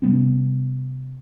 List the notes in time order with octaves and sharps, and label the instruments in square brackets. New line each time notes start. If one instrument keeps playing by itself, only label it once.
[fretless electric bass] C3 G3 B3 C#4